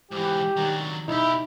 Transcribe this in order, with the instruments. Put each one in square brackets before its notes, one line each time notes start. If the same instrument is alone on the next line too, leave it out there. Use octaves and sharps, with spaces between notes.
[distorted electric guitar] G#2 E3 [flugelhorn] G4
[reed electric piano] D#3 G3 [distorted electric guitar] F#3 D4
[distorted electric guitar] B1 G4 [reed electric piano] D#4 [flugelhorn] E4